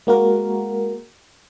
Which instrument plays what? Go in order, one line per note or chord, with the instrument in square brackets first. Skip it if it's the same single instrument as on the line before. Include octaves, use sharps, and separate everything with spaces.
[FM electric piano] G#3 A#3 F#4 A#4